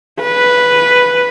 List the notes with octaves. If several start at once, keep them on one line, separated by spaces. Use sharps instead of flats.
B4